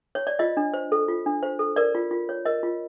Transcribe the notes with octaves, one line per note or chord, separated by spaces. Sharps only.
C#5
D5
F4 D#5
D4
C5
A4
F4
D4
C5
A4
A#4 D5
F4
F4
C#5
A#4 D#5
F4